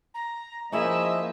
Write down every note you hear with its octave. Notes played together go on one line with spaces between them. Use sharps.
A#5
F3 A#3 C#4 E4 G#4 D#5 E5